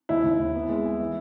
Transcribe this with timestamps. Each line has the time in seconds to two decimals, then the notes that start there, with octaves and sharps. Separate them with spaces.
0.09 D#2 E4
0.24 D#2
0.40 D#2
0.55 B3
0.69 G#3
0.85 G#3
1.00 E3